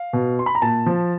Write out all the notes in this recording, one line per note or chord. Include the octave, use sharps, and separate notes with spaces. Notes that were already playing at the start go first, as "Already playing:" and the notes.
Already playing: F5
B2
C6
B5
A#5
A#2 A5
F3